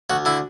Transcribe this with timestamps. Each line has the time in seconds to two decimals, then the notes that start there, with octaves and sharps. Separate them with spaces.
0.10 D2 F#4
0.25 D3 E4